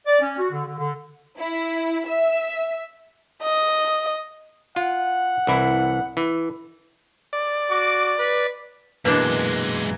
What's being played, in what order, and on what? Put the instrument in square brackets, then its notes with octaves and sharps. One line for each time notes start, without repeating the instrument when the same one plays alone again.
[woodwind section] D5
C#4
F#4
D3
D3
D3
[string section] E4
E5
[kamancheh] D#5
[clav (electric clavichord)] F4 [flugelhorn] F#5
[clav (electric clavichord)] C2 E3 E4
E3
[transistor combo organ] D5
[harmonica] F#4 D6
B4
[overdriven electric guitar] F#2 G#3 [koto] B2 D4 [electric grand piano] E3 A#3